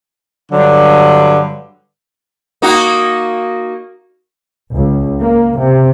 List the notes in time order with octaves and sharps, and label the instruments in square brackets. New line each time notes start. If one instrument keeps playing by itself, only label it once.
[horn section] G2 D3 F#3
[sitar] A#3 D#4 F#4
[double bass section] C#2
A#3
C3